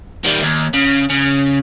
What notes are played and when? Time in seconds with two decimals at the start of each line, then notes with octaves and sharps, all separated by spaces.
0.24 D#3 G3
0.42 D#2
0.73 C#3
1.10 C#3